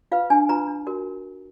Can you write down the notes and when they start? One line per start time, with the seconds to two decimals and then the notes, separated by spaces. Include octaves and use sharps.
0.12 F4 B4 F5
0.30 D4 G#5
0.49 F4 B4 A#5
0.68 D4
0.87 F#4 A#4